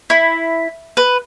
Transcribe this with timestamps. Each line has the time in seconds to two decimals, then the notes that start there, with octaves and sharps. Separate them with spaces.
0.10 E4
0.97 B4